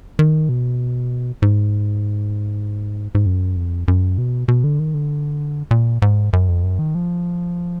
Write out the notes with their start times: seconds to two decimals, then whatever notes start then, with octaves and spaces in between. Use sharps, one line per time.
0.19 D#3
0.49 B2
1.42 G#2
3.15 G#2
3.26 F#2
3.57 F2
3.88 F#2
4.18 B2
4.48 B2
4.64 D3
4.79 D#3
4.94 D3
5.71 A#2
6.02 G#2
6.33 F#2
6.49 F2
6.63 F#2
6.79 D#3
6.95 F3